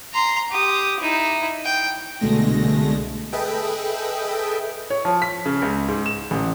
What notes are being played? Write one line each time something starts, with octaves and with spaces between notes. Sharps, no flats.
A#5 C6
G4 D#6
D#4 E4
G5
C2 B2 D3 G#3 A3 A#6
G#4 A4 B4 D#5 E5 G5
C#5
F3
B6
C#3
C#2
G#2
E7
A1